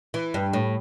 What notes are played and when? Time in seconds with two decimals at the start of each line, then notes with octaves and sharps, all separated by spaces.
0.14 E3
0.34 G2
0.53 A2